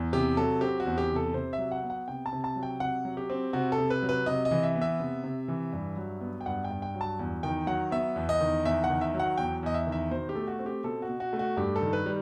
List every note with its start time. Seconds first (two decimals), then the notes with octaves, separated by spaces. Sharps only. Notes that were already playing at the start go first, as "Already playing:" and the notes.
Already playing: E2
0.13 C3 G4
0.37 F#3 A4
0.61 C4 G4
0.80 F#4
0.86 E2
0.98 G4
1.11 C3
1.16 A4
1.34 C3 C5
1.53 E5
1.58 F#3
1.72 F#5
1.83 B3
1.90 F#5
2.08 C3 G5
2.26 A5
2.33 C3
2.44 A5
2.56 F#3
2.63 G5
2.80 C3 F#5
3.05 F#3
3.17 G4
3.30 C4
3.53 C3 F#4
3.72 A4
3.78 C3
3.90 B4
4.02 F#3
4.09 B4
4.26 C3 D#5
4.45 D#5
4.51 E3
4.63 E5
4.76 B3
4.81 E5
5.00 C3
5.24 C3
5.48 E3
5.73 G2
5.97 F#3
6.21 B3
6.41 G5
6.46 G2 F#5
6.64 G5
6.71 G2
6.82 G5
6.95 F#3
7.01 A5
7.19 E2
7.43 D#3 G5
7.67 F#3 F#5
7.91 B3 E5
8.16 E2
8.29 D#5
8.41 D#3
8.65 E2 E5
8.84 F#5
8.90 D#3
9.01 E5
9.14 F#3
9.19 F#5
9.38 E2 G5
9.63 E2 D#5
9.74 E5
9.87 D#3
9.92 E5
10.11 B2 C5
10.29 G4
10.35 A3
10.48 F#4
10.59 C4
10.66 G4
10.84 B2 A4
11.02 F#4
11.09 B2
11.20 F#4
11.33 A3
11.39 F#4
11.57 G2 G4
11.76 A4
11.81 D#3
11.93 B4
12.06 G3